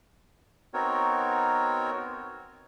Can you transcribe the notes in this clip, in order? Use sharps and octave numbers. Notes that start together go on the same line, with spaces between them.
B3 C4 D#4 F#4 A#4 C#5